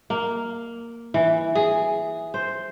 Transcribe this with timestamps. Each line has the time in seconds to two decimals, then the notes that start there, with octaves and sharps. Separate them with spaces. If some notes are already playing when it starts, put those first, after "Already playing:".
0.10 A#3
1.14 E3
1.55 G#4
2.34 C5